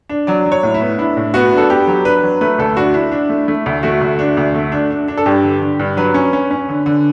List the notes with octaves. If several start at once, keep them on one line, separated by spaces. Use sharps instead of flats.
D4
F#3 D5
F#3
C#5
A2
E4
B3
D4 E4
A2
B3 F#4
D4 A4
B3 G4
F#3
D4 B4
F#3
A3 B4
D2 A4
D4 F#4
D4 E4
D4
A3
A3
D2
A3 F#4
D2
D4
D2
A3
D4
D4
D4
A4
G2 G4
D3
D3
G2
F#3 B4
C#4
C#4
C#4
D3
D3